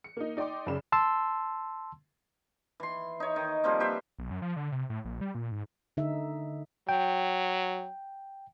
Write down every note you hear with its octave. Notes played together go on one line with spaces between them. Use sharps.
C#7
A#3 D#4
D#4 D5 G5 C6 D6
F#2 C#3 C#4 D5 B5 E7
A5 C6 E6
E3 C6
D#4 C#5
D#3
F3 G3 A#3 C4
G4 B4 C5 E5
B1
F#2
F3
D3
C3
A2
A#1
G3
A#2
G#2
D3 D#4 E5
F#3 G5